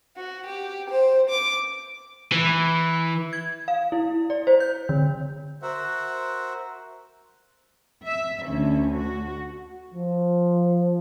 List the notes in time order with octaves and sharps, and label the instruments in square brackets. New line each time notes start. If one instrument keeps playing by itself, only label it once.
[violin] F#4
G4
C5
D6
[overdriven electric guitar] E3
[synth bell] G#6
F5
E4
D5
C5
G6
D3
[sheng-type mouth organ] F#4 A#4 C5 E5 F#5
[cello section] E5
D2 D3 C#4
F#4
[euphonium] F3